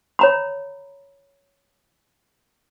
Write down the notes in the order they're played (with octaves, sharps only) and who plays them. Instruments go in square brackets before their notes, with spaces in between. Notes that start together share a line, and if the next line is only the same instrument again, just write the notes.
[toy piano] C#5 A#5 B5